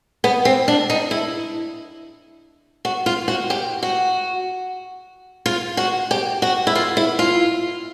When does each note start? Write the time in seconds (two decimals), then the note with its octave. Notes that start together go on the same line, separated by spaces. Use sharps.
0.24 B3
0.45 C4
0.68 D4
0.90 D#4
1.11 E4
2.85 F#4
3.06 F4
3.28 F#4
3.50 G4
3.83 F#4
5.46 F4
5.77 F#4
6.11 G4
6.42 F#4
6.67 E4
6.75 F4
6.97 E4
7.19 F4